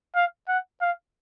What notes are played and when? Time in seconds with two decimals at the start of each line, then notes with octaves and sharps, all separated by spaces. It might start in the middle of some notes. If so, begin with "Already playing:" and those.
0.16 F5
0.48 F#5
0.82 F5